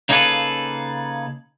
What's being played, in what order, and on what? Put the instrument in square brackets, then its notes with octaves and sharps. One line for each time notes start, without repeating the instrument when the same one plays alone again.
[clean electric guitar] C#3 A#3 D#4 G#4 A4 B4